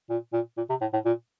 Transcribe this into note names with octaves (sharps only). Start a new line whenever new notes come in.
A#2
A#2
A#2
C3
A2
A2
A#2